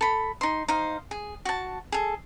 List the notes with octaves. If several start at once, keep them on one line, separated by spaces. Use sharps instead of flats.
A4 B5
D#4 C6
D#4 C5 F5
G#4
F#4 A5
G#4 A4